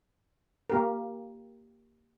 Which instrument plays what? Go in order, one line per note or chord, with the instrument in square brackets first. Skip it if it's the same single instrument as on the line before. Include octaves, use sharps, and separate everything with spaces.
[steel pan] A#3 G4 A#4